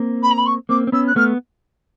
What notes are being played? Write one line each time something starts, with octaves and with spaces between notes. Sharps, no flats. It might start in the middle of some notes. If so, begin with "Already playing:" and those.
Already playing: A#3 C4
B5
A#5
B5
C#6
A#3 C4 D6
C4
B3 C#4 E6
F#6
A3 B3 F6